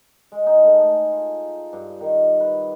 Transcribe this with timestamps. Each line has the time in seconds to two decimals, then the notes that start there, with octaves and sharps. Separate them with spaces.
0.32 G#3
0.46 D#4
0.64 A3
0.81 G#4
1.12 F4
1.73 G2
2.01 D#3
2.40 B4